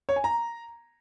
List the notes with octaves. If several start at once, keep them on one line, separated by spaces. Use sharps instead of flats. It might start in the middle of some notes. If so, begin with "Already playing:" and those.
C#5
G#5
A#5